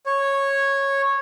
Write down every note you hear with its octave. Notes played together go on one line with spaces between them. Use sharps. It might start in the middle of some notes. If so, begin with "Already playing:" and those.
C#5